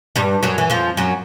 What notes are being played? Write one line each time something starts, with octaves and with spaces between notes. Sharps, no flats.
G2 G3
F#2 F#3
E3
F2 F3
F#2 F#3